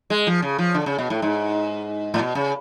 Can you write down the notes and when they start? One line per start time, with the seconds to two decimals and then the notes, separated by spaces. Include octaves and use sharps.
0.10 G#3
0.27 F3
0.42 C#3
0.59 F3
0.74 D3
0.86 C#3
0.98 B2
1.10 A2
1.22 G#2
2.14 A2
2.19 B2
2.35 C#3